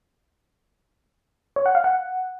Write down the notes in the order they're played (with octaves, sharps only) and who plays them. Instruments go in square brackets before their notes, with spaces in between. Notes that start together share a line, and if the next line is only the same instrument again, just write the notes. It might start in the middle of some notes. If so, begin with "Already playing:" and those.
[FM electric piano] C#5
F#5
F5
F#5